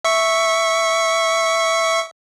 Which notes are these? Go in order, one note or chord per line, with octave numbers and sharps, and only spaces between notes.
E5 C#6